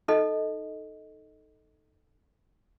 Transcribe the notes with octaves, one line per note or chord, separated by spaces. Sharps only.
D#4 A4 D#5